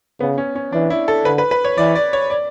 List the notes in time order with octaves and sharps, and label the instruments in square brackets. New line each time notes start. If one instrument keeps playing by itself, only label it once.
[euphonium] C#3 [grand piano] B3
[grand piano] C#4
C#4
[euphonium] E3 [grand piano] D4
[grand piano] E4
A4
[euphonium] D3 [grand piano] B4
[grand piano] B4
B4
C#5
[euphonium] E3 [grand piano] D5
[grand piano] D5
C#5
D5